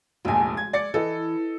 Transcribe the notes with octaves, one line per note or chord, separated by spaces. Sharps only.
F1 A#1 F2 G#3 G#5
G#6
D5 A6 C#7
E3 A4 D#5